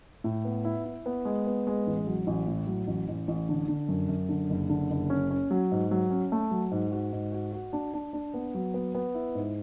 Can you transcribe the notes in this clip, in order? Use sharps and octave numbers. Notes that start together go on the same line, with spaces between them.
A2
B3
E4
E4
B3
G#3
B3
G#3
A1
F#3
A1
A2
F#3
A1
A1
A1
D3
D3
F#2
F#2
D3
F#1
D3
F#1
C#4
C#4
F#3
G#2
F#3
C#4
A3
F#3
G#2
F#4
G#2
F#4
F#4
D4
D4
D4
B3
F#3
B3
B3
E4
G#2